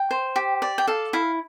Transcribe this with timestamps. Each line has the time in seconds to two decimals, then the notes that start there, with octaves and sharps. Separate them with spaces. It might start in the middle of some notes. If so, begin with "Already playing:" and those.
Already playing: G5
0.11 C5
0.36 G4
0.62 D5
0.78 G5
0.87 A4 F5
1.13 E4 F5